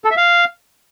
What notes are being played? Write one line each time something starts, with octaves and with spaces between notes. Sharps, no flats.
A4
E5
F5